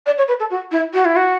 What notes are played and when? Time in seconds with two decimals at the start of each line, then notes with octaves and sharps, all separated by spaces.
0.06 D5
0.18 C#5
0.28 B4
0.40 A4
0.50 F#4
0.72 E4
0.94 F#4
1.05 E4
1.16 F#4